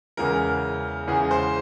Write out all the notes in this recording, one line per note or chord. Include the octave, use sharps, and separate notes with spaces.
E2 C#3 E3 G#3 A#4
E2 C#3 E3 G#3 G#4
C5